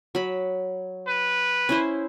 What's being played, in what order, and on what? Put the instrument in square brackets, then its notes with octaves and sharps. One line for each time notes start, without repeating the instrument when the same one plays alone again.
[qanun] F#3 B5
[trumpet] B4
[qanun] C#4 E4 C5